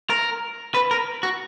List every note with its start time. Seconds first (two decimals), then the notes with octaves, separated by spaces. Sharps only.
0.10 A#4
0.74 B4
0.91 A#4
1.23 F#4